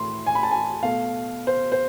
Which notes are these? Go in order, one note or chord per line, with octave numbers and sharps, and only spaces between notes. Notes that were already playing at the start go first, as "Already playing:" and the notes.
Already playing: A2 E3 C6
G#5
B5
A5
G#5
B2 A3 F5
C5
C5